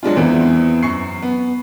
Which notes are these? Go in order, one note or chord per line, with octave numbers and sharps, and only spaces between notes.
F#3 G#3 D4 F4
E2 E3 B3 C4
F#2 C#6 C7
B3